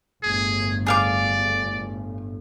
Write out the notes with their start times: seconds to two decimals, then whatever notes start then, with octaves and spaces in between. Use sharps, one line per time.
0.23 G1 A2 G#4
0.86 G#4 D5 F5 D6